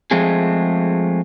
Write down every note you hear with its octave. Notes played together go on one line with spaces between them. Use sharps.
F3 G#3 A3 C4 G#4